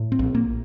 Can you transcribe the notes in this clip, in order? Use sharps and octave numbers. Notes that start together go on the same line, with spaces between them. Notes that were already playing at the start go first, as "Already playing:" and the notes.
Already playing: A2
C4
A#1
A#3